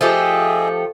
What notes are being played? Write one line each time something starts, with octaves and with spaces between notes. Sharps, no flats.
F3 A3 G4 G#4 D#5 E5